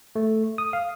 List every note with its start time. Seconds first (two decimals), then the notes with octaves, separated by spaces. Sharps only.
0.16 A3
0.58 D#6
0.73 F5